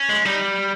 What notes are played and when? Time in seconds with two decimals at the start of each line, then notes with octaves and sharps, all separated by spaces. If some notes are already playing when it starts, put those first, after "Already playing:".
Already playing: C#4
0.09 G#3
0.25 G3 D#4